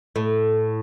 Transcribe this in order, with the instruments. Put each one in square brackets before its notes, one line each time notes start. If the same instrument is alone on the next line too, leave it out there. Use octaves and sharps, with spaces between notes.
[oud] A2